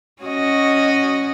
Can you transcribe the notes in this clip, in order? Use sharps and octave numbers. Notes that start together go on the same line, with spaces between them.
C#4 F#4 D#5